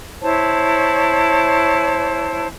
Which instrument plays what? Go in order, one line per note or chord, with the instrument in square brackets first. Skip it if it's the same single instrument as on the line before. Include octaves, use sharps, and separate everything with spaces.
[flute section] E4 C5 C#5 A5